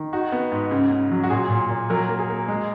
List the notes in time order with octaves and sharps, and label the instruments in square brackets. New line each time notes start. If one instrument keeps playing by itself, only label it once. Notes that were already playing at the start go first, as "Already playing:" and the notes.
Already playing: [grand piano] D#3
D#4 F#4
B3
G#2
C#3
C#3
F#3
F#4
A#2 G#4
A#2
A#2
F#3 A#4
A#3
G#4
A#3
G#3